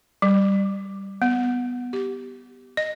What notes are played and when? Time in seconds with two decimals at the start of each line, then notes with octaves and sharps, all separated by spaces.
0.22 G3
1.22 B3
1.93 G4
2.77 D#5